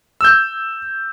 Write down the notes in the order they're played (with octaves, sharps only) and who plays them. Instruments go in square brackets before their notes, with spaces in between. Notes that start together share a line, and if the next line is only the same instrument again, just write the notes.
[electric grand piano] E6 G6